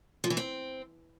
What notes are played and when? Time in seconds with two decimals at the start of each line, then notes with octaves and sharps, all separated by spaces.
0.24 F3
0.30 E3
0.37 C4